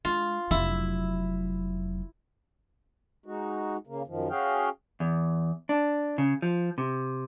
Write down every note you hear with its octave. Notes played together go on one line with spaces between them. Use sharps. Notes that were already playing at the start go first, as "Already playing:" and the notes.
G#3 F4
F1 F#3 E4
G#3 D#4 F#4
C#3 A#3
F#2 D#3 F3
C#4 F#4 G#4 F5 G5
E2
D4
C#3
F3
C3